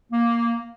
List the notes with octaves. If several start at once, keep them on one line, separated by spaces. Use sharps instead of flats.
A#3